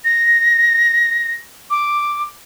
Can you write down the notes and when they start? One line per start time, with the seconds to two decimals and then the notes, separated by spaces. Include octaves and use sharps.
0.05 A#6
1.70 D6